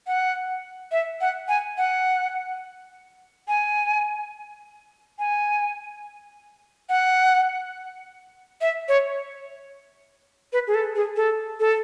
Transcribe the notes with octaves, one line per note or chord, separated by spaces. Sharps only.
F#5
E5
F#5
G#5
F#5
G#5
G#5
F#5
E5
C#5
B4
G#4
A4
G#4
A4
A4